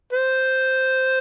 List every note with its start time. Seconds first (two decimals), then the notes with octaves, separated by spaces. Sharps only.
0.13 C5